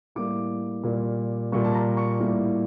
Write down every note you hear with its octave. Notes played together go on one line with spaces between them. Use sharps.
A2 G3 A#3 D6
A#2 G3 A#3
A#2 G3 A#3 C#6
A5
A#5
C#6
A2 G3 A#3